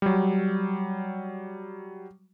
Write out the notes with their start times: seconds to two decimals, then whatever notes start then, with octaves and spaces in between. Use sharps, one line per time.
0.02 F#3 G3